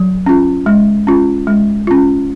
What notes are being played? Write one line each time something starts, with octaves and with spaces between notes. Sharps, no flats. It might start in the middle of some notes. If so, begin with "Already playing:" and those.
Already playing: F#3
C#4 F4
G#3
C#4 F4
G#3
C#4 F4